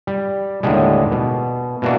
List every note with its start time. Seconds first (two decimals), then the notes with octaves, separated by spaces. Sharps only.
0.07 G3
0.63 D#2 A2 D3 G3 G#3
1.11 B2
1.82 B2 E3 A#3 D4 F#4